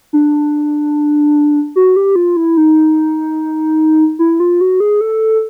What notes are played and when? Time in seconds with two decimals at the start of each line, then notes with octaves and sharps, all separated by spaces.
0.13 D4
1.76 F#4
1.96 G4
2.16 F4
2.37 E4
2.57 D#4
4.19 E4
4.40 F4
4.61 F#4
4.80 G#4
5.01 A4